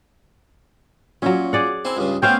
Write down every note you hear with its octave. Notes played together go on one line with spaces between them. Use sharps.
A#2 F#3 C#4
G#4 D5 F#5
C4 E4 G#5
C#2 G2 C#3
A3 B3 C#4 C5 F5 G5